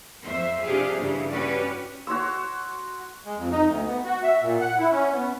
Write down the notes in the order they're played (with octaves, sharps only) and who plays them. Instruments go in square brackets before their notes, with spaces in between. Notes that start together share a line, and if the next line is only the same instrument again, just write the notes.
[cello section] F2 C5 E5
C3 D4 F4 G4 G#4 F5
G2 C#3 E3
C#4 F#4 G4 B4 D5
[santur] F#4 C#5 C6 E6
[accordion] G#3
F2
D#4
D2
B3
F#4
E5
A#2
F#5
E4
C#4
B3